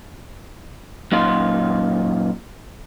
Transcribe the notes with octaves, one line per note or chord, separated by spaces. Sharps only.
F#2 A#2 D#4 F4 C6